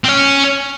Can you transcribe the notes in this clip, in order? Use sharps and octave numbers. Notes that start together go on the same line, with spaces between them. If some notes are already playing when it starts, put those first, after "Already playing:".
C4
C#4